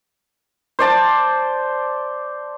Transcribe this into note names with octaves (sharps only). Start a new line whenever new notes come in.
C5 D5 A5